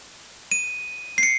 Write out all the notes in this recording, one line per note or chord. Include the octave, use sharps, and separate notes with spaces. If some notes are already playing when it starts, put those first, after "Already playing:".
D#7
C7
C#7